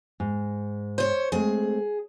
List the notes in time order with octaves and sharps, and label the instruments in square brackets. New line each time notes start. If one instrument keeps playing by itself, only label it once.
[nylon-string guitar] G#2
[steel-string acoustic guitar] C5 C#5
[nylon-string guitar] G#3 A3 C4 [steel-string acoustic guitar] G#4